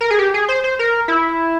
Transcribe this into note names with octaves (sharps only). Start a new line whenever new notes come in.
A#4
G#4
G4
G#4
C5
C5
A#4
E4